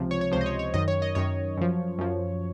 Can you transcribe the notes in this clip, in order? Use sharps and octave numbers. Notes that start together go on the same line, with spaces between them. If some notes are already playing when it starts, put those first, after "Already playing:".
Already playing: C#2 C3 F3
C#5
C#5
C#2 C3 F3 C5
D#5
C#5
C#5
F#2 D#3 D#5
C#5
D#5
F#2 D#3 C#5
F#2 F3
F#2 F3